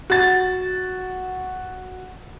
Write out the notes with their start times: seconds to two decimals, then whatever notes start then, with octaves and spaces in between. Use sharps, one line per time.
0.10 F#4 A6